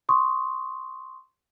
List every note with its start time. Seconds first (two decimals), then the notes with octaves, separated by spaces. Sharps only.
0.09 C6 C#6 D#6